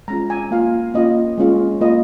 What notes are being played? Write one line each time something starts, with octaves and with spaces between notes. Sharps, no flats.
G#3 C#4 F4 A#5
G#5
A#3 F4 F5
A#3 C#4 F4 D#5
G#3 C#4 F4
A#3 F4 D#5